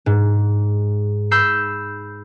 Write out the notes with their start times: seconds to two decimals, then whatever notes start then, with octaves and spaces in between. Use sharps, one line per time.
0.06 G#2
1.31 B5 E6 G6 C7